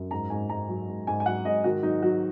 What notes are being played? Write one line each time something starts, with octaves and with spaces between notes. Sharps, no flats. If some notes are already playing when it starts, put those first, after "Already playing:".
Already playing: F#2
G#2 A#5
G#2 G#5
G#2 A#5
F#3
G#2
G#2 G#5
G#5
F#3 F#5
G#2 D#5
D#3 F#4
F#3 D#4
F#3 F#4